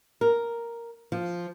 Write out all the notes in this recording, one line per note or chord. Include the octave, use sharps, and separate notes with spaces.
A#4
F3